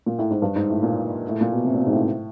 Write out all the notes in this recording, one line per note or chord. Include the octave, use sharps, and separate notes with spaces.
A#2
A2
G#2
G2
G#2
A2
A#2
A2
A#2
B2
C3
A#2
B2
G#2
A2